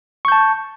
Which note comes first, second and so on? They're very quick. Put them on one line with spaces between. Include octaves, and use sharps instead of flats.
C#6 G6 A5